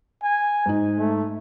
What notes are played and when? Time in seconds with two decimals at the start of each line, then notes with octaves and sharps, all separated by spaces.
0.23 G#5
0.66 G#2 D#4
0.98 A3